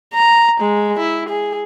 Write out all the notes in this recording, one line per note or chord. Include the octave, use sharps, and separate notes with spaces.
A#5
G#3
E4
G#4